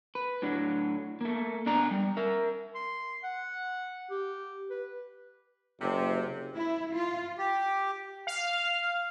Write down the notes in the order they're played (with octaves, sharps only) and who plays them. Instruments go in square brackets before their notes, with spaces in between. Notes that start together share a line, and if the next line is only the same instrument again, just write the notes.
[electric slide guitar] B4
A2 F#3 D4
A3 A#3
B2 D4 D5 A#5
G3
A#4 E5
[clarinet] C6
F#5
G4
B4
[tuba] F#1 [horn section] C3
[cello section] E4
F4
[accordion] G4
[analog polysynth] F5